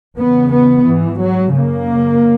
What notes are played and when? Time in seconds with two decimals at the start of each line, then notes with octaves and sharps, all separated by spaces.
0.17 E2 C#3 B3
0.52 B3
0.87 G#2 E3
1.21 F#3
1.57 F#2 C#3 A#3